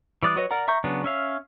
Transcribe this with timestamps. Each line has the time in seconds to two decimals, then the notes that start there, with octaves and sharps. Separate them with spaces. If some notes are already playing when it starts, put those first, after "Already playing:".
0.23 E3 G3 D5 D#6 F#6
0.36 F#3 F#4 B4 C#5 D#5
0.51 A#4 D5 F#5 A#5
0.68 E5 A#5 C#6 G6
0.84 C#3 F#3 B3 D4
1.04 C#4 E5 F5